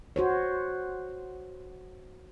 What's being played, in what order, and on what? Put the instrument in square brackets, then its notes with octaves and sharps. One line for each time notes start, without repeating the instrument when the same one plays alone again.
[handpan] F#4 C5 C#5